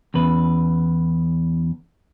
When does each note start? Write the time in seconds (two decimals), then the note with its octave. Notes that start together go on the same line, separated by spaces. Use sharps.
0.14 E2 C#3 B4